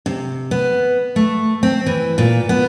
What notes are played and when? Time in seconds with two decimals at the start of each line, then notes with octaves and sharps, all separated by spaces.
0.06 C3
0.51 B3
1.16 A3
1.63 C4
1.86 E3
2.18 A#2
2.49 B3